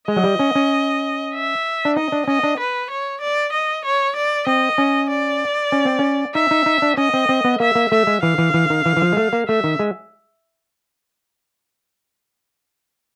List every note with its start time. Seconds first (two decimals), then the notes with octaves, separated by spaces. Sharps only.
0.08 G#3 D#5
0.16 F#3
0.24 G3
0.39 C#4
0.55 C#4
1.34 E5
1.85 D4
1.96 D#4 D#5
2.12 D4
2.27 C#4 D#5
2.43 D4
2.59 B4
2.90 C#5
3.21 D5
3.53 D#5
3.85 C#5
4.16 D5
4.47 C4 D#5
4.78 C#4
5.10 D5
5.72 C#4
5.85 C4
5.99 C#4
6.34 D#4 E5
6.51 D#4
6.66 D#4
6.82 D4
6.97 C#4 D#5
7.14 C4
7.29 C4
7.44 B3
7.60 A#3 E5
7.75 A#3
7.91 A3 E5
8.07 G#3
8.23 E3 F5
8.38 E3
8.54 E3
8.70 D#3
8.86 E3
8.97 E3
9.02 F3
9.13 G#3
9.17 A3
9.33 A#3
9.48 A3 E5
9.64 D#3
9.79 G#3